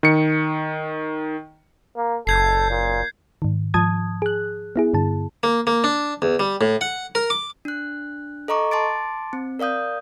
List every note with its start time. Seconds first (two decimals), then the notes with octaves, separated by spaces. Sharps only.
0.03 D#3 C#7
1.97 A#3
2.27 F#1 A4 G6 G#6 C7
2.70 A#2
3.42 G#2 D#3
3.74 G#2 F3 A5 D#6 G#6
4.22 G#4 F#6
4.76 B3 E4 G#4
4.93 G2 D3 A5
5.43 A#3
5.67 A#3
5.84 D4
6.22 E2
6.40 G3
6.61 A2
6.81 F#5
7.15 A#4
7.30 D6
7.65 D4 F#6
8.48 A4 D#5 A#5 C#6 D6
8.71 A5 C6 D6 A6 D7
9.33 C4
9.59 A#4 D5 F5 D#6 G6